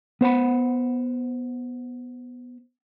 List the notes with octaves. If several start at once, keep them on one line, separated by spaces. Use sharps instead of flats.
B3 C5 F#5 B5